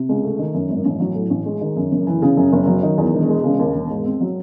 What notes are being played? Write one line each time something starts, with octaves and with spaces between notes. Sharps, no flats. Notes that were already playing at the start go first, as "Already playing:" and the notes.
Already playing: C3
C#2
A3
D#3
F#2
G#1
A1
F#3
A2
A1
G#3
D#3
F#2
F#1
E3
C#3
F#2
F#1
F#3
D#3
E2
E1
G#3
C#3
D#2
E1
G#2
C4
F#3